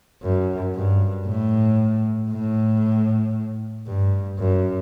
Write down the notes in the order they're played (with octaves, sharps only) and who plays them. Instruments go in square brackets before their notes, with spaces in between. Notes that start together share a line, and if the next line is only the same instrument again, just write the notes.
[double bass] F#2
G2
A2
A2
G2
F#2